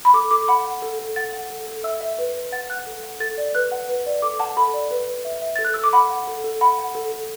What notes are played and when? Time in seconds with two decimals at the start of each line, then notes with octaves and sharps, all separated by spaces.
0.05 B5
0.14 A4 D6
0.31 A4 D6
0.48 F#5 B5
0.65 F#5
0.82 A4
0.99 A4
1.16 F#5 A6
1.33 F#5
1.50 A4
1.67 A4
1.84 E5 E6
2.01 E5
2.18 B4
2.35 B4
2.52 F#5 A6
2.70 F#5 F#6
2.87 A4
3.03 F#5
3.20 A4 A6
3.38 D5
3.55 B4 F#6
3.72 F#5
3.89 B4
4.06 D5
4.22 A4 D6
4.39 F#5 A5
4.57 A4 B5
4.74 D5
4.91 B4
5.08 B4
5.25 E5
5.42 E5
5.56 A4 A6
5.65 F#6
5.74 A4 E6
5.84 D6
5.93 F#5 B5
6.10 F#5
6.27 A4
6.44 A4
6.61 F#5 B5
6.78 F#5
6.95 A4
7.12 A4